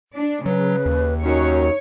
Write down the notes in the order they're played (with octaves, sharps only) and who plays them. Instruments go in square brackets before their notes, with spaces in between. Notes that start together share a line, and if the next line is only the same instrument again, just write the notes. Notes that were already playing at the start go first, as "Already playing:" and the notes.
[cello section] D4
[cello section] C#3 [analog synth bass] F#3 [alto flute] B4
[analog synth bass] D#2
[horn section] F#2 [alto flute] D#4 [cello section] C#5